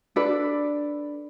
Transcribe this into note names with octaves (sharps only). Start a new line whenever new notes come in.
D4 A4 B4 D5